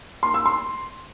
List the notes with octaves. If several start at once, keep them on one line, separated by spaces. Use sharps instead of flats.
C6
E6
C6